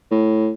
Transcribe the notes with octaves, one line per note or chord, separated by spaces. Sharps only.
A2